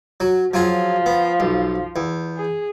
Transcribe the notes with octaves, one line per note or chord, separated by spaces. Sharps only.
F#3
F3 F#3 F4 G#4
B3
B1
E2
G#4